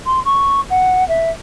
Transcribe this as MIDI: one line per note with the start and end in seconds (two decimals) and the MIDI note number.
0.06 0.20 84
0.25 0.60 85
0.70 1.06 78
1.08 1.30 76